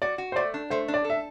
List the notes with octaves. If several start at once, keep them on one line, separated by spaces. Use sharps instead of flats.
F#4 D5
F#4
C5
A3 D5
D4
A3 C5
D4
D5
A4
E5